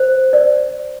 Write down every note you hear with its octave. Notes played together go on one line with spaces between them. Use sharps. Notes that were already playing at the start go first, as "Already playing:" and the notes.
Already playing: C5
D5